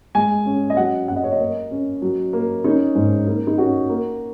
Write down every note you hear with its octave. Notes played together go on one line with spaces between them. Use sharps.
G#3 G#5
C#4
D#5
F#3 F#5
F#2 F#5
D#5
C#5
D#5
A#3
C#4
F#3
A#3
C#4 D#4
G#2
A#3 D#4
D#4
C#4 F#4
A#3